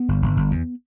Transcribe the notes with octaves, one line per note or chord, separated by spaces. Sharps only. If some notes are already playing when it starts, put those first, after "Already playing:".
Already playing: B3
G1
G1
G1
E2